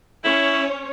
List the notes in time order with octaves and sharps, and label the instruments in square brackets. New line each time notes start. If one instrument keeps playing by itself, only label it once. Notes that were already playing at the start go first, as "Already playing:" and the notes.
[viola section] C#4 C#5 [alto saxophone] E4